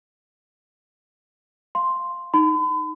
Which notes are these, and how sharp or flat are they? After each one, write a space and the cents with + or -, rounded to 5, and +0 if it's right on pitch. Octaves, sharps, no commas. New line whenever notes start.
F5 +0 C6 +0
D#4 +0 B5 +45